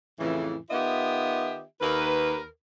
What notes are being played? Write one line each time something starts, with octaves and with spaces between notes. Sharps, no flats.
F2 A2 C#3 E3
D#3 B3 F4 G4 D#5 E5
D#2 A#4 B4